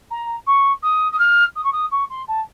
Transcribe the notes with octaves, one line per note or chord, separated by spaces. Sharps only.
A#5
C#6
D#6
D#6
F6
D#6
C#6
D#6
C#6
C6
A5